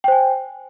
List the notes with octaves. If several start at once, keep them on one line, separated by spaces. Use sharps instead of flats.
C5 G5 G#5